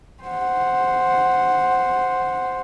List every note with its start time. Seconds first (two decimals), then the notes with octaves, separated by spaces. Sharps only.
0.23 C5 F#5